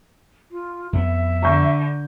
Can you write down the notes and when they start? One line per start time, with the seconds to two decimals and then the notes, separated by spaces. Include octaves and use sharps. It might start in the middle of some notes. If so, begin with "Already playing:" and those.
0.51 F4
0.93 F2 B3 E5
1.43 D3 A#5 C#6 G6